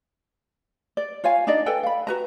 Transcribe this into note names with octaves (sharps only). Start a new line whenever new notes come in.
D5
F4 C#5 F5 G#5
D4 D#4 D5 D#5
A4 B4 G5 G#5
F5 B5
F#4 B4 A#5